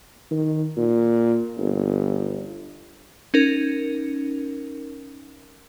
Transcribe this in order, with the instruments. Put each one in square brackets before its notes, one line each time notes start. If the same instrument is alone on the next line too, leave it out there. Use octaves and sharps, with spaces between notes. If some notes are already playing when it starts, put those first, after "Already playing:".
[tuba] D#3
A#2
G1
[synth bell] C#4 D#4 A#4